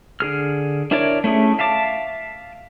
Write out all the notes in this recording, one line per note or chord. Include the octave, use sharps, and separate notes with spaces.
D3 G#4 F6
D4 E4 A#4 C#5 D5
A3 C#4 E4 G#4
E5 F5 A5 D6